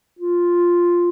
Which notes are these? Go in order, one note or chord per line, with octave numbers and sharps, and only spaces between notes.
F4